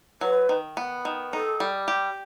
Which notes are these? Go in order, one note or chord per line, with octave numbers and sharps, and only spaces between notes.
F#3 B4
D#3
B3
D#3
D#4 A4
G3
G4